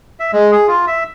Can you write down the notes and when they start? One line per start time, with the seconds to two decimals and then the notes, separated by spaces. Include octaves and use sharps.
0.20 E5
0.33 G#3
0.52 G#4
0.67 F4
0.87 E5